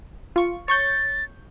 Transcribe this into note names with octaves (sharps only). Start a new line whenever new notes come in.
F4 C#6
C#5 C#6 G6 A6